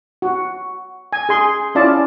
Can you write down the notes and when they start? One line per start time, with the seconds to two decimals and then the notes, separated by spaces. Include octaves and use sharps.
0.22 F#4
1.13 G#5
1.29 G#4 C6
1.75 C#4 E4 F4 D5 A5